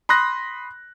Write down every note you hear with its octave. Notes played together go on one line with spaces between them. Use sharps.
B5 C6 D#6 F#6 A#6